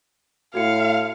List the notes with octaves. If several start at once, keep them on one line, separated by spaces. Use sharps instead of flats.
A2 F#4 F5 C#7